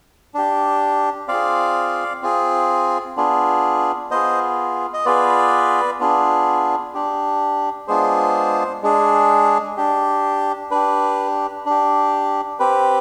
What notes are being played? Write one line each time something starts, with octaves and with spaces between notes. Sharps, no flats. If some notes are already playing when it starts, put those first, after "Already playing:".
D4 G4
C4 F4 G#4 D5 F5
C4 F4 G#4
B3 D4 F4 G#4
B3 F4 G#4 C5 D#5
D#5
B3 F4 G#4 B4 D5
B3 D4 F4 G#4
D4 G4
G#3 B3 D4 F4 G#4 C5
G#3 D4 G#4
D4 G4
D4 G4 B4
D4 G4
C4 G4 B4